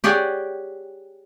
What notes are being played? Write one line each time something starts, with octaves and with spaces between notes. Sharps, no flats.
G4 G#4 C#5 D5 F#5 G5